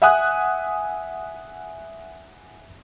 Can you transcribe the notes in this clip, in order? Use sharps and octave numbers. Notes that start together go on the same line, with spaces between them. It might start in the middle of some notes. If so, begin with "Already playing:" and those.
E5 F#5 G#5 D#6 F#6